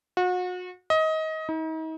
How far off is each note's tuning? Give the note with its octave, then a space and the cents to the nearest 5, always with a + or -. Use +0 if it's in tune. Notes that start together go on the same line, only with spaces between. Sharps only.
F#4 -35
D#5 +25
D#4 +40